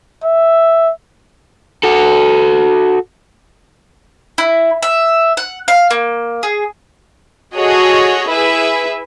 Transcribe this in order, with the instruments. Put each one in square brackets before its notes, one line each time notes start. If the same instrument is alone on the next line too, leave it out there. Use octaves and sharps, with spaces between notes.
[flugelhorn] E5
[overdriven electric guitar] F#4 A4
[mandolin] E4
E5
F#5
F5
A#3
G#4
[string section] F#4 G#4 A4 C#5 D#5
E4 G#4 B4 E5